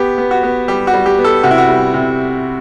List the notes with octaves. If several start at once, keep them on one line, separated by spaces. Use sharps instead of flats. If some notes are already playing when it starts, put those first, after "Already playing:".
Already playing: B3 G4
B3
F#4
B3
G3 G4
F#4
G3
G4
B3
A4
C3 F#4
E4
F#4
G3
C3